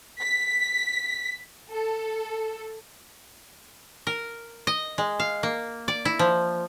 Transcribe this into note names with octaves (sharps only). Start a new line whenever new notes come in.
B6
A4
A#4
D#5
G#3
F5
A#3
D5
E4
F3